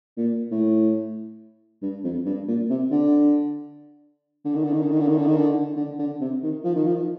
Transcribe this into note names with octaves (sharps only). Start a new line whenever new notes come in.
A#2
A2
G2
F2
G2
A#2
C3
D3
D3
D#3
D3
D#3
D3
D#3
D3
D#3
D3
D#3
D3
D3
D3
C3
D#3
F3
D#3
F3